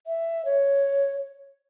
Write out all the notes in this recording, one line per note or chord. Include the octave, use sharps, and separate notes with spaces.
E5
C#5